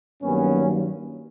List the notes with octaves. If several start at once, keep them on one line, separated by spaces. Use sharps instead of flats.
G2 D#3 F#3 A#3 B3 C#4